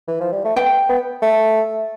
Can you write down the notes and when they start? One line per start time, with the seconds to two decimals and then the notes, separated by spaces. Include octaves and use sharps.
0.08 E3
0.20 F3
0.32 G3
0.44 A3
0.56 B3 G5
0.89 B3
1.22 A3